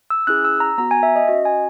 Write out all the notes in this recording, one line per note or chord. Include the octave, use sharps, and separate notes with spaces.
E6
C#4 E4 G#4 F#6
E6
A#5
B3 F#4 A#5
G#5
E5
D#5
C#4 F#4 D#5
G#5